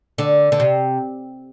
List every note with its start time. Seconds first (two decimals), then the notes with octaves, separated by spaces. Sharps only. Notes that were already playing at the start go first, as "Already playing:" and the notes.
0.18 D3
0.52 D3
0.60 C3